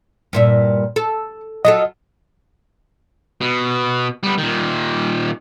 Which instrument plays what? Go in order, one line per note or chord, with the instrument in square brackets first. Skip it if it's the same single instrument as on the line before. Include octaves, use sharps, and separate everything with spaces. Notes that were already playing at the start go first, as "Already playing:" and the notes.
[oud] G2 A#2 E4
A4
[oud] F#3 F4 A4 [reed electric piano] D#5
[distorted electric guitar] B2
G3 B3
A#2 D#3